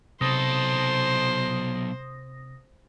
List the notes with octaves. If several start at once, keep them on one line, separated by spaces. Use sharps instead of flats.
B1 C3 A4 C5 D#6 A#6